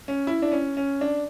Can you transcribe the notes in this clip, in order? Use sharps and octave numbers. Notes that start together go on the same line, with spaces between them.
C#4
E4
D4
C#4
C#4
D4